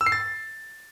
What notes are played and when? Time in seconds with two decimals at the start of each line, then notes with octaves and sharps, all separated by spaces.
0.01 E6
0.06 C7
0.12 A6